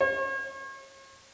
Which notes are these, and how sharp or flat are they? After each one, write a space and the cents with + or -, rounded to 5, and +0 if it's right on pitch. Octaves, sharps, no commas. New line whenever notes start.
C#5 -40